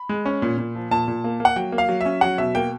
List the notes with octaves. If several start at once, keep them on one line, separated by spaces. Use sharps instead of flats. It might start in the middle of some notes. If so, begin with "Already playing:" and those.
Already playing: B5
G#3
C#4
A#2
A#2
F3
A#2 A5
A#2
A#3
A#3
F#5
F#3 G5
A#3
F5
F#3
C#4 E5
F#3 F#5
B2 E5
A#3 G5